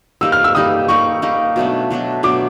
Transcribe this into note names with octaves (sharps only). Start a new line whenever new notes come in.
G3 A#3 D#4 G4 E6
F6
E6
G3 A#3 D#4 G4 D#6
G3 A#3 D#4 G4 C#6
G3 A#3 D#4 G4
B2 F#3 A3 D4
B2 F#3 A3 D4
B2 F#3 A3 D4 D6